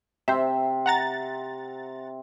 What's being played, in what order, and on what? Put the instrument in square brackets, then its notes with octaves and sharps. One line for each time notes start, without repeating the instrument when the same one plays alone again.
[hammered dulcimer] C3 [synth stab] C5 E5
[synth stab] F#5 A#5 A6